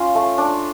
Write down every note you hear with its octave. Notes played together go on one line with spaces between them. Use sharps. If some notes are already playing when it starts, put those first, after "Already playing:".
Already playing: C#4 F4
A3
D4